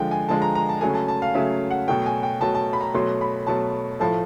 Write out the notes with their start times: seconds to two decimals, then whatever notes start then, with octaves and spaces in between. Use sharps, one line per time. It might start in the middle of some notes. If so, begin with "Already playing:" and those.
Already playing: D3 F3 G#3 G5
0.11 G#5
0.29 D3 F3 G#3 A5
0.42 A#5
0.55 A#5
0.69 A5
0.81 C#3 F#3 A3 G#5
0.94 A5
1.08 A5
1.22 F5
1.35 C#3 F#3 A3 E5
1.71 F#5
1.88 B2 F#3 A3 G5
2.06 G#5
2.23 G5
2.40 B2 F#3 A3 A5
2.55 A5
2.73 B5
2.81 A#5
2.94 B2 F#3 A3 C6
3.21 B5
3.47 B2 F#3 A3 A5
4.00 A2 F3 A3 A5